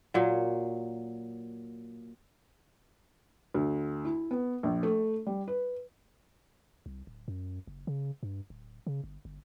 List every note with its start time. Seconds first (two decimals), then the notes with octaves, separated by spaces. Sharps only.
0.14 A#2 F#3
3.54 D2
4.05 E4
4.31 B3
4.63 A#1
4.83 A3
5.26 G3
5.48 B4
6.86 C2
7.07 D1
7.28 F#2
7.67 F#1
7.87 C#3
8.23 G2
8.50 D1
8.87 C#3
9.04 G1
9.25 G1